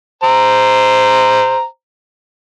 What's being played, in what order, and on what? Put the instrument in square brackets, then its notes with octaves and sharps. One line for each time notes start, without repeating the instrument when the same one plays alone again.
[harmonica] C5 A#5